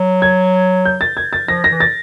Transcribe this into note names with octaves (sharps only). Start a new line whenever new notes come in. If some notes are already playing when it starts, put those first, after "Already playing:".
Already playing: F#3
G#6
G6
A6
G#6
A6
F3 A#6
A#6
E3
A6